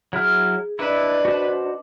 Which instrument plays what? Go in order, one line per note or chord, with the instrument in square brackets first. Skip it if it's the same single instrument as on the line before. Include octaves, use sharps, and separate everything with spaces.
[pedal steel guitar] F#3 E4 F6 [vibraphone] G#4
[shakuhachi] D4 [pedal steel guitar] E4 [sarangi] B4 [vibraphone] D#5 D6
[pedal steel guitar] F#4 C5